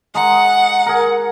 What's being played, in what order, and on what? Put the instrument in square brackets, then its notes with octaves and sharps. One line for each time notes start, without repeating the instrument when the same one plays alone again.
[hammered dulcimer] G#3 D#5 A#5 [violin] F#5
[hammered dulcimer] G#4 A#4